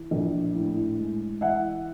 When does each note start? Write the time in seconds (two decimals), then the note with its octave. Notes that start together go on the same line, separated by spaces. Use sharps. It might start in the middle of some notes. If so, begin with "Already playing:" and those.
Already playing: E3
0.11 A#1
0.55 A2
0.98 G#3
1.41 E3 E5 F#5